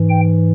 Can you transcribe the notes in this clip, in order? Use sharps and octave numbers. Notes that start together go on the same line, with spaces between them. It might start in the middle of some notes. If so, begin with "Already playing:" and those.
Already playing: G#2 E3
G5